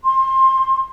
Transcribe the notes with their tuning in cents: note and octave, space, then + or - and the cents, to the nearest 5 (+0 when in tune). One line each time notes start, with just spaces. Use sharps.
C6 +20